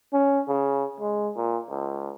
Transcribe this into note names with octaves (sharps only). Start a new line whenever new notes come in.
C#4
C#3
G#3
A#2
C#2